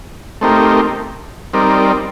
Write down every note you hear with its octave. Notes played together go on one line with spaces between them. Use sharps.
A3 C4 D#4 G4 A#4
G3 C4 D#4 A#4 D5